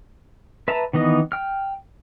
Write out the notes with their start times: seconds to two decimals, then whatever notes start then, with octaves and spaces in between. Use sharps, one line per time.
0.68 B4 E5 A5 A#5
0.93 D#3 E3 B3 D#5
1.32 G5 F6